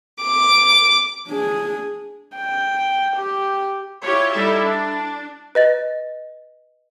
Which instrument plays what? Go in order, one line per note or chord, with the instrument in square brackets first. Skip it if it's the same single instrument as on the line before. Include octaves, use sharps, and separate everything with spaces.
[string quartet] D6
[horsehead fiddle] D4 G#4
[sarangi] G5
G4
[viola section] E4 F4 G4 C#5
G3 D#4 E4 A4 E5
D4
[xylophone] B4 D#5 A6